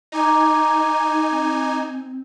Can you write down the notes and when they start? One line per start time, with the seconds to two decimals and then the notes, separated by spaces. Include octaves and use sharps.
0.12 D#4 G#5 A#5 D6
1.31 C4